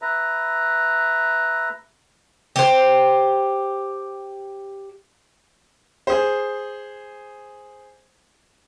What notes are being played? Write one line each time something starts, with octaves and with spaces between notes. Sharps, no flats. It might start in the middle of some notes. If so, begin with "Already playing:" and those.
B4 E5 A#5
G4 C5
G#4 C5